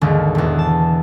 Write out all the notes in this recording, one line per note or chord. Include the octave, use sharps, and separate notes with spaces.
G#1 D#2 D3 D#3
E1 E2
A5